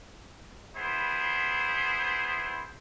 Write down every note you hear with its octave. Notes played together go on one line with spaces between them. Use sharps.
B3 E4 G#4 C5